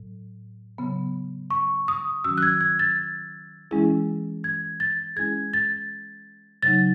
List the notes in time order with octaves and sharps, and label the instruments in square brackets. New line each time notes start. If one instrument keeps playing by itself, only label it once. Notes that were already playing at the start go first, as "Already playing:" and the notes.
Already playing: [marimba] A2 F#3
C#3 F#3 B3
[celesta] C#6
D#6
[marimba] D#3 F#3 C#4 F#4 [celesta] E6
[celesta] F#6
G#6
G#6
A6
[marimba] E3 G#3 C#4 E4 G#4
[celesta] G#6
A6
[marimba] G#3 C#4 E4 G#4 [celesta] G#6
[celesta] A6
[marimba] C#3 F#3 A3 D#4 [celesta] A6